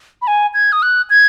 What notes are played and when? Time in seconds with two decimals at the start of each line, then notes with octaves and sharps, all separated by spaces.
0.22 B5
0.27 G#5
0.54 G#6
0.72 D#6
0.82 F#6
1.10 G#6